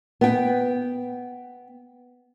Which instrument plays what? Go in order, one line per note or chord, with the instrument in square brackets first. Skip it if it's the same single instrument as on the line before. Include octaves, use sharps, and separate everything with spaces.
[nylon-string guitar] B3 G5